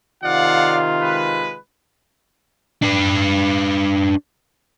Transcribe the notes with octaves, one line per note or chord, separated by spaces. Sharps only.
C3 D#3 F4 D5 F5 F#5
G#3 B4
D4 B4